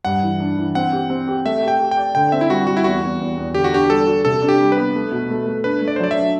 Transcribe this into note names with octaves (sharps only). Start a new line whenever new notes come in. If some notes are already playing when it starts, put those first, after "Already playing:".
G2 F#5
E3
D4
E3
C4 F#5
G4
C4
G4
A3 E5
G4
G5
G4
G5
D5
D3 G5
C4 E5
E4
G3 F#4
G3 F#4
E4
E2 F#4
E2
E2
E2
D3 G4
F#4
D4 G4
G3 A4
F#4
C3 A4
D4
G4
G3
B4
B3
A3
B2
A3
A3
D4 B4
A3
D5
C5
F#3 D5
E5
D4